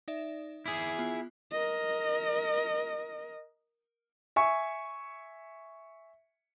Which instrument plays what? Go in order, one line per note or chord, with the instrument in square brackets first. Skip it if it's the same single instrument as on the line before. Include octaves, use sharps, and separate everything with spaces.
[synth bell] D#4 D5 E5
[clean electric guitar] E4 G#4 [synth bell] D6 D#6
[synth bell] B3 F4
[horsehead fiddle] A#4 D#5
[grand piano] E5 G#5 C#6